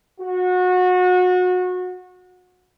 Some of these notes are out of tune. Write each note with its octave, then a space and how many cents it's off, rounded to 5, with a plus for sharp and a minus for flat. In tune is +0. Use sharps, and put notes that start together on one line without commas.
F#4 -25